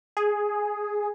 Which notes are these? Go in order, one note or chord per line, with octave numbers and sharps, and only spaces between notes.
G#4